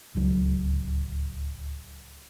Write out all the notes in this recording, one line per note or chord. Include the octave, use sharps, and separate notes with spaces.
D1 C#2 F#3